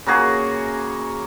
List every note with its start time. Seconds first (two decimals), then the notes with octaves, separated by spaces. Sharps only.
0.07 C#3 A#3 F#4 G#4